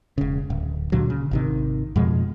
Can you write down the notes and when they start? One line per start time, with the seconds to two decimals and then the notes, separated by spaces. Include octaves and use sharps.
0.18 E1 C#3
0.50 D1
0.92 C#2 A#2 D3 F#3
1.10 C#3
1.31 G#1 C3 D#3
1.96 F2 B2 F3 G#3